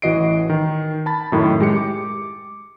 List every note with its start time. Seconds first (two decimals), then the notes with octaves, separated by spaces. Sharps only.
0.02 A1 E3 F#4 D#5 C7 D7
0.50 D#3
1.06 A5 B5 A6
1.32 F#2 A2 D#3
1.60 G#3 G4 C#7
1.76 D6